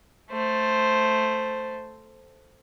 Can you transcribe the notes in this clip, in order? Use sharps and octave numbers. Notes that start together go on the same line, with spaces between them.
A3 C5